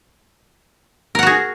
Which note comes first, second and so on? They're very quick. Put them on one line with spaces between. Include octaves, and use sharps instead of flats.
A#4 F#5 F#4 G#4